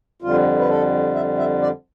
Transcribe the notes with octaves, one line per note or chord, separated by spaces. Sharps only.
F2 D3 G3 F4
B4
A4
E5
E5
D5